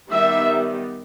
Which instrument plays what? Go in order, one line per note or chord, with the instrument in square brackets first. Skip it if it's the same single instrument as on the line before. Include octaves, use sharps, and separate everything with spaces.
[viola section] D#3 G3 B3 E5